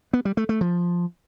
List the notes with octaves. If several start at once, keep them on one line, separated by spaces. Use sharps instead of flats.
B3
G3
A3
A3
F3